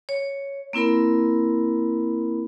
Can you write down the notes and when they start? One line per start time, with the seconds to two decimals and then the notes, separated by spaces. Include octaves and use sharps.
0.09 C#5
0.73 A#3 C4 E4 A#4 B5